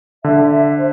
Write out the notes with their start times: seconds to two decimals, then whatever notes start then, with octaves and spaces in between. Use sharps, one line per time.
0.24 D3 E5
0.50 E5
0.77 C5